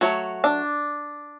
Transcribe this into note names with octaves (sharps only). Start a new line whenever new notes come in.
F#3 A3 C#5
D4 D5